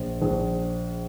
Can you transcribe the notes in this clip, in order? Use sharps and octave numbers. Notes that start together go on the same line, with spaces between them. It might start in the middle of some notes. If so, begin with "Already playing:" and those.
Already playing: A#1
A#1